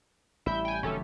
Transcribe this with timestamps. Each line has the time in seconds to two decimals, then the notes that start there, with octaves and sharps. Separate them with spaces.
0.46 A1 G3 E4 E5 G6
0.65 G5 G#5
0.83 F1 D#3 F#3 A3 C#4 G4 A4